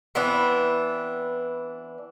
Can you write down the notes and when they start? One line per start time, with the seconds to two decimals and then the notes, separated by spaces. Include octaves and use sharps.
0.15 E3 B3 C4 D4